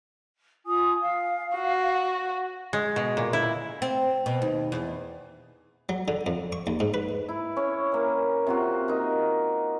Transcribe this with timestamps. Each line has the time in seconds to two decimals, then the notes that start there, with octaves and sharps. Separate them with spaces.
0.65 F4 G#5 D#6
1.01 F5
1.55 F#4
2.73 G#3
2.96 B2
3.17 A#2
3.33 E4
3.82 C4
4.26 B2
4.42 D#2
4.72 E2
5.89 F#3
6.08 D3
6.27 F2
6.52 C#6
6.67 D#2
6.80 G#2
6.94 B4
7.29 E4
7.56 C#4 C#5 C#6
7.92 E3 A#3
8.47 C3 F4 F#4
8.88 A#3 D#4